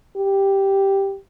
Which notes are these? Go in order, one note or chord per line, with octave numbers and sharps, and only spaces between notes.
G4